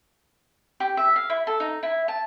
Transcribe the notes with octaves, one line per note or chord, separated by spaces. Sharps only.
G4
E5
F5
E4
A4
D#4
E4
A5